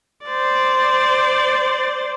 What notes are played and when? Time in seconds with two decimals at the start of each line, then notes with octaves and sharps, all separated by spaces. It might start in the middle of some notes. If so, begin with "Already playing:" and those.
0.26 C5 D5